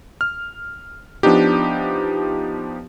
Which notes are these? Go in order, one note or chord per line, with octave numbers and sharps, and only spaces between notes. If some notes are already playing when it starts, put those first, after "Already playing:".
F6
F3 B3 D4 D#4 G4